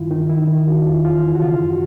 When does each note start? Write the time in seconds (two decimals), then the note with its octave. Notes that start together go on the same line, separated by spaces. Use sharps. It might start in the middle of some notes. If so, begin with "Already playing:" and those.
Already playing: G2 D#3 E4 F4
0.11 D#3 D#4
0.30 D#3 E4
0.48 D#3
0.67 D#3 F#4
0.86 E2 F4
1.04 E2 F4
1.23 E2 E4
1.35 F#4
1.42 C#3 F4
1.61 F#2
1.71 F#4